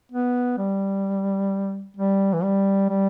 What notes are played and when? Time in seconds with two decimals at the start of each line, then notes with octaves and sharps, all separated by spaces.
0.11 B3
0.58 G3
1.97 G3
2.33 E3
2.43 G3
2.89 G3